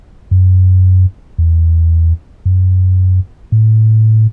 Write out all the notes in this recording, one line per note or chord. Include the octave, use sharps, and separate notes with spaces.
F#2
E2
F#2
A2